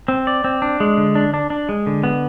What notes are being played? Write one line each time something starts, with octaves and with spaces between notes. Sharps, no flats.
C4
D5
C4
D4
G#3
D3
D4
D4
D4
G#3
D3
B3